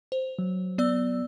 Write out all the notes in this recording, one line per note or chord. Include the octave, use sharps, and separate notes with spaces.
C5
F#3
B3 D5 E6